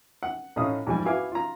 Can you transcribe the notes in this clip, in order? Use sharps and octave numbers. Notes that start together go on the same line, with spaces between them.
F#5
A2 C#4 D#4 F5 D#6
G#2 F3 G3 G#5
E4 F#4 B4 F5 G#5 D6
F4 A#5